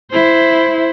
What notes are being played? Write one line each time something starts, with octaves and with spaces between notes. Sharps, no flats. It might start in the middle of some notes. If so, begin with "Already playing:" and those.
E4 C5